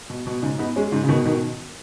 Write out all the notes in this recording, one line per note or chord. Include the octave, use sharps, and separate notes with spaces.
B2
B2
G#2 C#3
B3 D#4
G#3 C#4
G#2 C#3
C#3
B2 D#3
B2 D#3